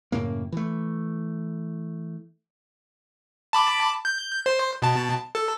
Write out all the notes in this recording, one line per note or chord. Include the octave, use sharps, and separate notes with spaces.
F#2 A2 C#3 A#3
E3 A3
A5 B5 D6
G6
C5
B2 A5
A4